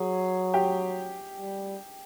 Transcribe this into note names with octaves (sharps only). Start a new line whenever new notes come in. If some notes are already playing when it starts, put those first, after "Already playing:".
Already playing: F#3 G#4
G4
G3